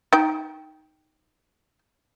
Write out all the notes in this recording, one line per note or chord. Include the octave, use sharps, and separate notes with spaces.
D#4 G5